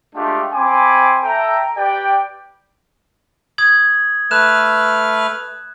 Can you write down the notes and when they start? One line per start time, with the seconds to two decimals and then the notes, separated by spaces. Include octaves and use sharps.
0.15 G#3 A3 D4 F4 G4
0.53 C4 G5 G#5 B5 C6 D6
1.23 A4 E5 G5 A#5
1.77 G4 B4 D5 G5
3.58 D#6 G#6 F#7
4.31 A3 B4 F6 F#6 E7